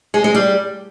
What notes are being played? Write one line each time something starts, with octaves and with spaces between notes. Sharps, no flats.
G#3
G#3
G3